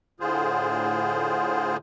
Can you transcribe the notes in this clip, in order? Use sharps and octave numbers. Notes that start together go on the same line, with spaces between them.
A2 D3 F4 G#4 C5